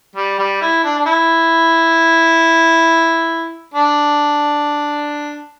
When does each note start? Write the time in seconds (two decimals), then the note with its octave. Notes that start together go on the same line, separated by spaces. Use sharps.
0.16 G3
0.39 G3
0.62 E4
0.84 D4
0.98 D4
1.06 E4
3.74 D4